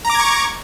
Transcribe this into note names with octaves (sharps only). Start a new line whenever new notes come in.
A#5 C#6 D6 G#6